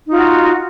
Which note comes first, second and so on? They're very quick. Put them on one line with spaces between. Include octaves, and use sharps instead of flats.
D#4 F4 F#4